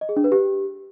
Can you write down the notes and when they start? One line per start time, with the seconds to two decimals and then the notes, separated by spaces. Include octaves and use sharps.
0.01 D#5
0.09 G#4
0.17 D4
0.24 B4
0.32 G4